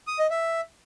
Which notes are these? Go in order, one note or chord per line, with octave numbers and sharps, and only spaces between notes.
D#6
D#5
E5